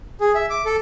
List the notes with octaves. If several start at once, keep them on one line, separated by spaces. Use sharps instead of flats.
G#4
E5
D6
A4